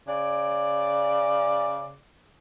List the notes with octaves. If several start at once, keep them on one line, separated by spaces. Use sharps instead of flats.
C#3 D5